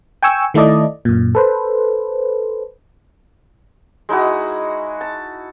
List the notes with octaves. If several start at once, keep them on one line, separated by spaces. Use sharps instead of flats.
G5 G#5 C#6 E6
D#3 A3 E4 A4 D5 D#5
F#2 A#2
A4 B4 C5
G#3 D#4 E4 F#4
A5